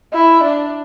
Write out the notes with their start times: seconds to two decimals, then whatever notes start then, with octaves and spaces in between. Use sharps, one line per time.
0.13 E4
0.43 D4